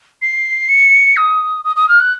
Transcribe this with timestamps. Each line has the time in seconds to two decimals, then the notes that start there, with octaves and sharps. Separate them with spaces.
0.22 C7
0.69 C#7
1.17 D#6
1.64 D#6
1.76 D#6
1.89 F6
2.00 F#6